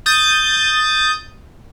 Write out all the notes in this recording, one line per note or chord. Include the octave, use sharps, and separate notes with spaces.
D#6 G6 A6